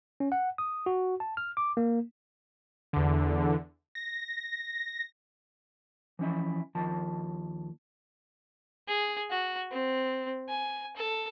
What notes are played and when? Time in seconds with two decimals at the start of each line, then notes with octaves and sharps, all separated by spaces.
0.20 C#4
0.32 F#5
0.58 D#6
0.86 F#4
1.20 A5
1.37 F6
1.57 D6
1.77 A#3
2.93 E2 D3
3.95 A#6
6.19 E3 F3 C#4 E4 E5
6.75 D#2 F3 A5
8.88 G#4
9.30 F#4
9.71 C4
10.49 G#5
10.97 A4